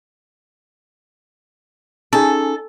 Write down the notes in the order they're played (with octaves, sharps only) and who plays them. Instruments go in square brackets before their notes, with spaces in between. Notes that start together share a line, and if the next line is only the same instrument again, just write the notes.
[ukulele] C#4 D#4 G#4 [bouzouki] A4